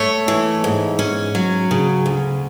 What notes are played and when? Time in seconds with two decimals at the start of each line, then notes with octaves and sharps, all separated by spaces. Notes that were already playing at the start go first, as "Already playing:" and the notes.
Already playing: A3 C#5
0.28 E3
0.64 G#2
0.99 C#4
1.35 F#3
1.71 C#3
2.06 D2